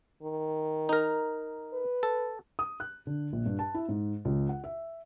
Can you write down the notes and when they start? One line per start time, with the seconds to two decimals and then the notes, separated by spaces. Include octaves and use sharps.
0.22 D#3
0.89 D#4 A#4
1.73 B4
2.03 A4
2.59 D#6
2.80 F#6
3.07 D3
3.33 A#1
3.46 G2
3.59 A5
3.75 E4
3.89 G#2
4.25 C#2
4.49 F#5
4.64 E5